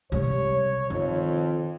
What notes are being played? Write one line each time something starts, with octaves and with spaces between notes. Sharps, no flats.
C3 G3 C#5
F2 D#3